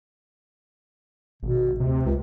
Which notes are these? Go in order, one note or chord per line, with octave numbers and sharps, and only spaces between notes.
G#1 B2
D2 C3
C#2